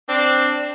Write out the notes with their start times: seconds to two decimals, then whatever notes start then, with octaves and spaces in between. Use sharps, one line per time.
0.08 C4 D4